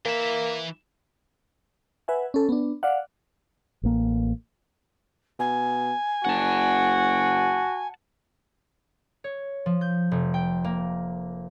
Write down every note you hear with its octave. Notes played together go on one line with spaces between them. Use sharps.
E3 A#3 E5
B4 E5 F#5 G#5
C#4 A4
B3 D4
D5 F5 F#5
A1 A#3
B2 G#5
F#1 F#4 F#5 A5
C#5
F3
G6
F1
G5
A#3